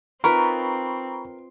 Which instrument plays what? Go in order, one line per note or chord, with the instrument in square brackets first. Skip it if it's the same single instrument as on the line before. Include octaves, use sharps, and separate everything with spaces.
[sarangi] C4 [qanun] D#4 F4 B4 [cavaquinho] A#4 [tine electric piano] A#5 B5 C#6